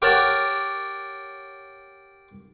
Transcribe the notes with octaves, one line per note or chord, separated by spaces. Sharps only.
G4 A#4 C#5 F#5 G5 A5